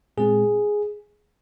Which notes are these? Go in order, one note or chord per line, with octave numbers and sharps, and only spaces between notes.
A#2 G#3 C4 G#4